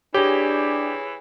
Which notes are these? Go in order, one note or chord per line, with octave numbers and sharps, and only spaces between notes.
E3 D4 G4 G#4 C#5